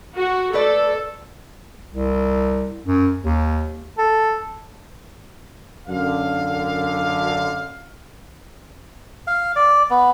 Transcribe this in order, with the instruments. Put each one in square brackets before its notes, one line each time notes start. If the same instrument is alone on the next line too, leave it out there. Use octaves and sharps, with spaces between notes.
[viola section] F#4
[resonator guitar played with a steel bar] A3 B4 D5 [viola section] A4
[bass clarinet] C2
F#2
D#2
A4
[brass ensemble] F#2 D3 F5
[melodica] F5
D5
B3